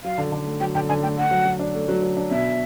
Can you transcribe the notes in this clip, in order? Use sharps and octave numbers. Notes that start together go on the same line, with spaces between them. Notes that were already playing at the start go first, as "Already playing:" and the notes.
F#3 F5
D3
D3
A3
F#3 G5
D3 G5
D3 G#5
A3 G5
A3 F#5
F#3
F#3
D4
A3
F#3
F#3
D4
B2 E5